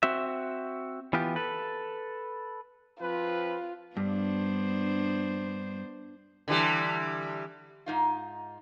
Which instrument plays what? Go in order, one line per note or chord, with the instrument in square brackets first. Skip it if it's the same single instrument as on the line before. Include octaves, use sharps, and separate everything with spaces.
[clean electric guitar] C4 F#4 E5
E3 B3 F4 G4
A4 B4
[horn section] F3 C4 B4 [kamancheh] F4
[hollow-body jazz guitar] G2 [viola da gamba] B3 D4 C5
[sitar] D3 E3 G3
[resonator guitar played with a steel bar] G#2 D#4 F4